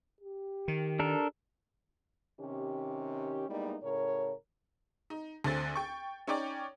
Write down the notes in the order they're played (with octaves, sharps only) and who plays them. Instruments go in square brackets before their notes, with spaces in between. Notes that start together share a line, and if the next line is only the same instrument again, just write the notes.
[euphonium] G4
[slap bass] D#3
[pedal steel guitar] D4 A4 A#4
[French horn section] C3 D#3 C#4 G4
G3 G#3 A#3 B3 D#4 E4
A2 C#3 A#4 C#5
[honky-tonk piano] D#4
D2 D3 C4 A6
G5 C#6
C#4 D#4 C#5 D5 G5 C#6